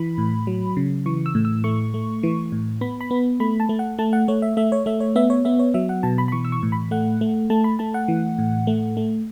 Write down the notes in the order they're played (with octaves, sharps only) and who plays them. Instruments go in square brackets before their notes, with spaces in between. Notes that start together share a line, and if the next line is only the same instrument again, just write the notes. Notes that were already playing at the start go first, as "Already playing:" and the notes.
Already playing: [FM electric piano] E3 B5
A2
F#3
C#3
E3 C#6
E6
A2
E6
A3 C#6
A3
E3
A2
B3 B5
B5
B3
A3 B5
A5
A3
F#5
A3 A5
F#5
A3 C#5
E5
A3 E5
C#5
A3 E5
C#5
B3 E5
C#5
B3 E5
C#5
F#3 E5
F#5
B2 A5
B5
B5
E3 C#6
E6
C#6
A2
B5
A3 F#5
A3
A3 A5
B5
A3 A5
F#5
E3
A2
A3
A3